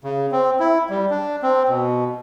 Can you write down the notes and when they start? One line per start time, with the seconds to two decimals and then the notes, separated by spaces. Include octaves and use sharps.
0.04 C#3
0.32 C4
0.60 E4
0.90 G3
1.10 D4
1.42 C4
1.69 B2